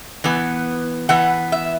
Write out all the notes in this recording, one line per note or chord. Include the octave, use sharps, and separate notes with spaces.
E3 B3
E3 B3 F#5
E5